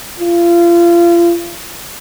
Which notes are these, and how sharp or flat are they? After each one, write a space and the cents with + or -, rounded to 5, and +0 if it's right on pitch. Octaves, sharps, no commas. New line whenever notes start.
F4 -30